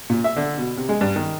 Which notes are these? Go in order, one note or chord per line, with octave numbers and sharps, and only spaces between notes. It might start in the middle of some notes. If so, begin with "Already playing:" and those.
A#2
E5
D3
B2
C3
G#3
G2
D#3